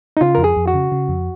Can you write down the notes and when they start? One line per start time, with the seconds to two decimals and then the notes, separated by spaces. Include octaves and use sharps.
0.17 D#4
0.21 C#3 F4
0.35 F2 A#4
0.44 G#4
0.57 F2
0.68 F#4
0.74 C#3
0.92 C#3
1.09 F2